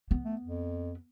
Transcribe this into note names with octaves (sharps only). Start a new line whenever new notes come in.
B3
A3
F2